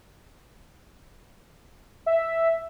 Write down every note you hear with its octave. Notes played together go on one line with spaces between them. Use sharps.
E5